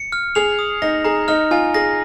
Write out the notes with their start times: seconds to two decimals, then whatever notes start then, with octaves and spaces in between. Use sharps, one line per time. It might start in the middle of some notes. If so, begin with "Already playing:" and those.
Already playing: C#7
0.12 F6
0.35 G#4 F7
0.59 D#6
0.82 D#4 A#6
1.04 G#4 A#5
1.28 D#4 F6
1.51 F4 G#5
1.74 G#4 A#6